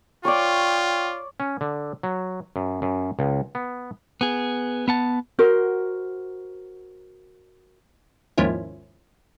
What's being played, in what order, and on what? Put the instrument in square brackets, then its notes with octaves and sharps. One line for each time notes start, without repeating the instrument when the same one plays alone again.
[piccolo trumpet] F4 [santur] C#5 D5 [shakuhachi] G5
[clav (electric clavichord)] C#4
D3
F#3
F#2
F#2
C#2
B3
[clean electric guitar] B3 G#4
B3 F#5 A5
[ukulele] F#4 A#4 C5
[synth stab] D#2 G#2 F3 A#3 C#4 E4